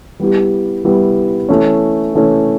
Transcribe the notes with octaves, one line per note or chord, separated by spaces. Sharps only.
G3 B3 E4 G4
G3 B3 E4 G4
E3 A3 C#4
E3 A3 C#4